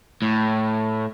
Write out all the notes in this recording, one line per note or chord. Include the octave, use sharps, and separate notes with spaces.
A2